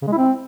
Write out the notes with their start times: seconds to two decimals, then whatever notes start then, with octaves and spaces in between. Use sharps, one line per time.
0.02 C#3
0.07 G#3
0.12 E4
0.17 C4